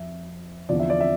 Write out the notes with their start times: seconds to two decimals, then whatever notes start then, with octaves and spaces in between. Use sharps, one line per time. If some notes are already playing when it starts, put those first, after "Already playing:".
Already playing: F2 E5
0.69 E2 D3 F3 D5
0.80 E5
0.90 D5
1.00 E5